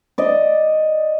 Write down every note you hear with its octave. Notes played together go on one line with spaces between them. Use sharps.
D5 D#5